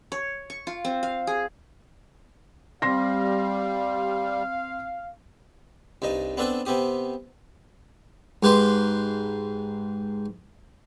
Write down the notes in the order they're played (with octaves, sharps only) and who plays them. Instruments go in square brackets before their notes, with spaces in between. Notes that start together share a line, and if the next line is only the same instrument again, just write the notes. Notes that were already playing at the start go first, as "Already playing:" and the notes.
[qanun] C#5
C#6
F4
C4
F5
G#4
[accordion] G3 [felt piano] C4 C6 A#6 [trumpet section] F5
[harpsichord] C2 G2 D#4 D#5
B3 C4 D4 A4 B4
C3 B3 C4 G4 D#6
G#2 G4 B4 C6